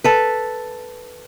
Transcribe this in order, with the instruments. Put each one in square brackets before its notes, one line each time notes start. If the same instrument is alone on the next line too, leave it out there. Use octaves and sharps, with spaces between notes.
[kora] A4 B4